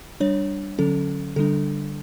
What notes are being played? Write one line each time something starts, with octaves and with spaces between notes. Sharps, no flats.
G3 D4 C#5
D3 F#3 C#4 A4
D3 G3 D4 A4